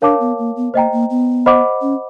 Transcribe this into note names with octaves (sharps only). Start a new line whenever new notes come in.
D4 A#4 C#5 F5 A5 D6
B3
A#3
B3
A#3 C5 D#5 G5 A#5
A#3
B3
C5 D#5 F#5 B5 D6
C#4